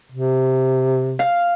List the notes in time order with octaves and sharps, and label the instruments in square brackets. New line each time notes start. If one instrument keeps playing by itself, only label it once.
[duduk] C3
[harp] F5